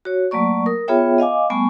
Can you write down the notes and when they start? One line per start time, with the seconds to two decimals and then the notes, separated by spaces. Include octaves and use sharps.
0.05 F#4 C#5
0.31 F#3 A3 A#3 D5 C#6
0.66 A#4 D#6
0.88 B3 F4 G#4 C#5 E5 G5
1.18 D#5 F5 G#5 D6
1.50 G3 A3 B3 G#5 C#6